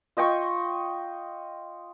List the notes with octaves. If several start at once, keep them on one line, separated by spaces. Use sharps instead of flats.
F4 D#5 G5 C#6